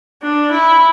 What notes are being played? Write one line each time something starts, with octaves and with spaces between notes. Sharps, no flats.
D4
E4